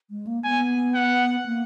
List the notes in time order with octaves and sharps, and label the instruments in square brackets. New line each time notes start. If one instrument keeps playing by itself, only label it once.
[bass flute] G#3
A#3
[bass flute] B3 [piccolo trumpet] G#5
[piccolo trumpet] F#5
[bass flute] A#3